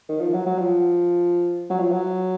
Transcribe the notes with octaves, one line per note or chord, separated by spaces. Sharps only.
D#3
F3
F#3
F#3
F3
F#3
F3
F#3